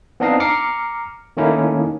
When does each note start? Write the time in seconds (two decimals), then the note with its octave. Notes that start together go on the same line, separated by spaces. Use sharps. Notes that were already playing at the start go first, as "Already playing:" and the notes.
0.20 B3 C4 D4 D#4 D#5 F5
0.40 A#5 D6 F6 C7 C#7
1.37 D#3 A3 A#3 C#4 D#4 E4